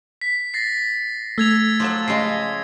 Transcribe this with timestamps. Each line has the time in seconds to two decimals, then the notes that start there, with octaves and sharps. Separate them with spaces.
0.21 B6
0.54 A6 A#6 C7
1.38 A3 E6 G#6 F7
1.80 F3 F#3 A5
2.08 C#3 G#3 C7